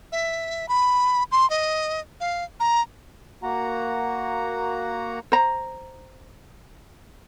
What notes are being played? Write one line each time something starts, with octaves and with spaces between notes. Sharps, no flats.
E5
B5
C6
D#5
F5
A#5
A#3 F#4 F#5 A#5
C5 A#5